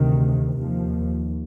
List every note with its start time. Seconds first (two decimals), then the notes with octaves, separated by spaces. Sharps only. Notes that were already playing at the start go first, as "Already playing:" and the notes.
Already playing: D2 C3 D#3
0.57 D#2 F3